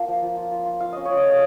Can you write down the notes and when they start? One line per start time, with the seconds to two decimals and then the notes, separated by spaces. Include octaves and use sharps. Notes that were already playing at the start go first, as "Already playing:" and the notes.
Already playing: A#3 F4 A5
0.08 F3
0.23 F3
0.37 F4
0.51 F4
0.66 F4
0.80 F4 F5
0.93 C#4 D#5
1.05 C#5
1.10 F4
1.17 D#5
1.24 A3